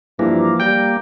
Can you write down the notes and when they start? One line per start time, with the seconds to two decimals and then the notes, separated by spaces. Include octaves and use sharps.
0.19 G2 E3 F3 A#3
0.60 G3 G5 G6